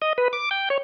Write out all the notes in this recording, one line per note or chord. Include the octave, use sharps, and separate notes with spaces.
D#5
B4
D6
G5
C#5